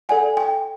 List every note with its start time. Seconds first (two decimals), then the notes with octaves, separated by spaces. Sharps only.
0.09 A4 D5 F#5 G#5
0.37 G5